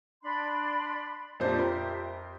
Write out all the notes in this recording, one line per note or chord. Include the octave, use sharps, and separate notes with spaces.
D4 B5 C6
F2 A#2 D4 G4 C5 E5
A#4 C6